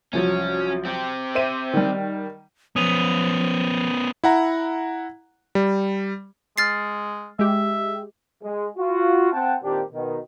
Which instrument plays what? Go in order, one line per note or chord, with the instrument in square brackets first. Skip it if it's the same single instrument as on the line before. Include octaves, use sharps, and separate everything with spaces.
[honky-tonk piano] C2 F3 F#3 [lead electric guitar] C#4
[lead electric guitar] C4 G4
[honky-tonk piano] C5 E5 D#7
D#3 G3
[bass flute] F3 [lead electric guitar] B3 C#4 [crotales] D#6 D#7 F7
[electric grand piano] E4 F#5 A#5
G3
[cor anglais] G#3 [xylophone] F6 A6 C7
[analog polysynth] G#3 G4 [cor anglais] E5
[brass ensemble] G#3
F4 F#4
C4 F#5 G5 A5
A#2 D#3 A#3 C4 D4 G4
B2 D#3